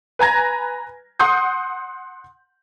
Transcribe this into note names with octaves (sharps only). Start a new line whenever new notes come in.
B4 G#5 A#5 G#6 A#6
F#5 C6 D#6 G6